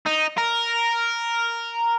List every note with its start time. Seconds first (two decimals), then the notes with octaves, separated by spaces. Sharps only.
0.06 D#4
0.38 A#4